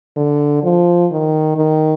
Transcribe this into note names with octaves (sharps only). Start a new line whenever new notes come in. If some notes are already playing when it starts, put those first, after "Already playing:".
D3
F3
D#3
D#3